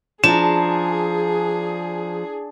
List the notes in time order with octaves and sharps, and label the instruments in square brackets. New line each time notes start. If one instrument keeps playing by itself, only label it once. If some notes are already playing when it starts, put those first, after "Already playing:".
[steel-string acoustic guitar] F3 [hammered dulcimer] D4 A#5 [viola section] G#4 [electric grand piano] E7